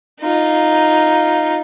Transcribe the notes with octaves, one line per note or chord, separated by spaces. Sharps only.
D#4 F4